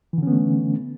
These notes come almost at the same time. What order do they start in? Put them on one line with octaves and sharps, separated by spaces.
E3 D3 C#4 B3 A3